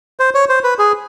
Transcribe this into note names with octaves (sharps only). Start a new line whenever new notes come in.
C5
C#5
C5
B4
G#4